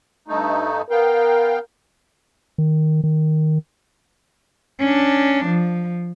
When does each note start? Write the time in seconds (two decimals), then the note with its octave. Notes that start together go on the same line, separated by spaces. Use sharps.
0.28 G2 A3 D#4
0.91 B3 A#4 F5 G5
2.58 D#3
3.04 D#3
4.80 C#4 D4
5.46 F3